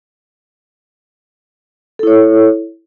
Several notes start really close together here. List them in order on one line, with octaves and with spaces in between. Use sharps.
A4 E4 C#5